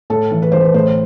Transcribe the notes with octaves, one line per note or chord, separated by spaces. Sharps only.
A2 A4
E3
B4
A1 C5
B4
A2 C5